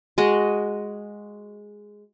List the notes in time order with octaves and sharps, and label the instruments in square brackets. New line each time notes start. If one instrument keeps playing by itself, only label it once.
[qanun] G#3 F#4 D#5